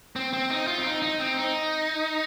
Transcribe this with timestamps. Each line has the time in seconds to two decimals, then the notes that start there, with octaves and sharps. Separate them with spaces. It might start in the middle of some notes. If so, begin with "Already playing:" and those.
0.16 C4
0.33 C4
0.50 D#4
0.67 F4
0.78 C4
0.85 D#4
1.02 D#4
1.19 C4
1.37 D#4